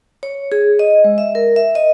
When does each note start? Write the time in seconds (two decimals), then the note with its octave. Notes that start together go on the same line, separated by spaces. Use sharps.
0.23 C#5
0.52 G#4
0.79 D#5
1.04 G#3
1.18 E5
1.35 A#4
1.56 E5
1.75 D#5